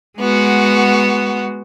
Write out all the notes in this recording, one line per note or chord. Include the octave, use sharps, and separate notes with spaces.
G#3 B3 F#4